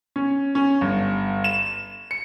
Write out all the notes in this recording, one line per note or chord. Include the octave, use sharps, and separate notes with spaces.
C#4
C#4
G1
E7
C#7